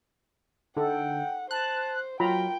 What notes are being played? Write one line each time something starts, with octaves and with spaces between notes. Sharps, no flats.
D3 D#4 A4 F#5 G5
C5 A5 F#6
F#3 F4 A#4 G5 A#5 B5